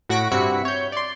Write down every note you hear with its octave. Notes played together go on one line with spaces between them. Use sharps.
A2 F#4 C#6 A#6 B6 D7
G2 C3 E4 F#4 B6 C#7
C#5 G6
D5 C6